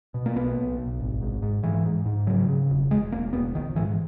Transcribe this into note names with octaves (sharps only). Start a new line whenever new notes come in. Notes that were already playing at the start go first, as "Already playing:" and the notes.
B2
A#3
B1 B3
B1
B1
G#1
G#2
G#2
G#2 E3
G#2
G#2
C#3 F#3
C#3
E1
E1 G#3
E1 A#3
E1 B3
A#1 D#3
G#2 E3